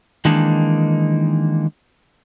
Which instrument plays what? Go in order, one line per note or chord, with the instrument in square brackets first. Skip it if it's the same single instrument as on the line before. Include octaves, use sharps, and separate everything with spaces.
[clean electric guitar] D#3 E3 G#3 A#3 D4 D#4